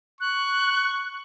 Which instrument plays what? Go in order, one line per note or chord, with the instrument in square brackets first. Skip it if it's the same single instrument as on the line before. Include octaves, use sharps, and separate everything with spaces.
[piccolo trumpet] C#6 [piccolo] F#6